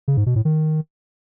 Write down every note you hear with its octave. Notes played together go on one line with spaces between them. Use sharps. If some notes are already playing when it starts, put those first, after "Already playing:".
C#3
G#2
B2
A2
D#3